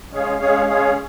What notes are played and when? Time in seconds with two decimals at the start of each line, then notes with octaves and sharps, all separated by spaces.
0.11 G#3 C#4 G#4 C#5 F5
0.39 G#3 C#4 G#4 C#5 F5
0.68 G#3 C#4 G#4 C#5 F5